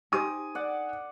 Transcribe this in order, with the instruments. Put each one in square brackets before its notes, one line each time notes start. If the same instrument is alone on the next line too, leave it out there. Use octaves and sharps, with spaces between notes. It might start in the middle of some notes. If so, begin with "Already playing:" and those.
[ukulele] D#4 G4 C5 [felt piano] G#5 D#6
[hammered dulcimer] D5 F#5